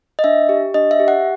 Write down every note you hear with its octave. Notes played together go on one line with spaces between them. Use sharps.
D#5
D4 E5
G4
D4 D#5
E5
G4
F#5